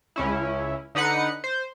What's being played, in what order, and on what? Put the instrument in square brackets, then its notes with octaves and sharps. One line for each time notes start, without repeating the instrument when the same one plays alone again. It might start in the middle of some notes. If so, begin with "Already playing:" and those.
[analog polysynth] C#2 C#4 E4
D3 D#4 B4 F#5 C#7
C5